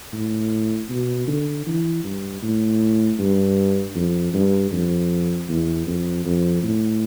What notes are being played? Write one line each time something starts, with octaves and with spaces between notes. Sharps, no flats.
A2
B2
D3
E3
G2
A2
G2
F2
G2
F2
E2
F2
F2
A2